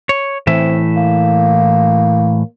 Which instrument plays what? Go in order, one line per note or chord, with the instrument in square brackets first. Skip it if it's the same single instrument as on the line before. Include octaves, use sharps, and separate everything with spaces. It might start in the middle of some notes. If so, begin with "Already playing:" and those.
[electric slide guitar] C#5
[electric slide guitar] A2 E3 E5 [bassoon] C4
[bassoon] A#3